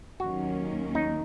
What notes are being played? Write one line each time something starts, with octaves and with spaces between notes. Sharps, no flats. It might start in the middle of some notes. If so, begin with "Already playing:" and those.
D#2 D#3 F#3 A#3 C#4 F#4
D#4